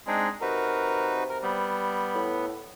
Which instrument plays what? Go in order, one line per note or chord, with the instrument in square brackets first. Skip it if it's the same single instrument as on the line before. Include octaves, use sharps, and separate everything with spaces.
[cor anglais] G#3 [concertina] C4 D4 D#4
[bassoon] C3 [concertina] D#4 F#4 B4 [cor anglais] A#4
[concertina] A#4
[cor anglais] G3 [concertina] B3
[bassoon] A2